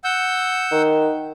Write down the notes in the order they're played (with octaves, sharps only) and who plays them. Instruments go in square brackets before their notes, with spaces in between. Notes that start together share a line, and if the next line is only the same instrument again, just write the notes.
[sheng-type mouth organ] F#5 E6 G6
[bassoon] D#3